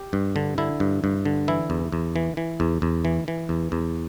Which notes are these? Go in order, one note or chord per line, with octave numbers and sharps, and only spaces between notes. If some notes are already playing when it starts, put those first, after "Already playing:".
Already playing: G4
G2
D3
D3 E4
G2
G2
D3
E3 E4
E2
E2
E3
E3
E2
E2
E3
E3
E2
E2